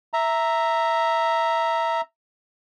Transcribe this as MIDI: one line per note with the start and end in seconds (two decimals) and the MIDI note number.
0.13 2.01 76
0.13 2.01 82